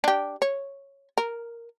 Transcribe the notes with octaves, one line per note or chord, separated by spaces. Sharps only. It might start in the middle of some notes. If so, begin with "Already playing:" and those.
D4 G4
C#5
A#4